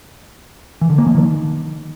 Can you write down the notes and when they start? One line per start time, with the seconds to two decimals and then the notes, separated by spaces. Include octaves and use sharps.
0.81 E3
0.90 D3
0.98 A#3
1.06 F3
1.15 D#3